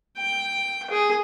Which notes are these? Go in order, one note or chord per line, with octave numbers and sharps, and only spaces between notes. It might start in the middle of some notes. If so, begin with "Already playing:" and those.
G5
G#4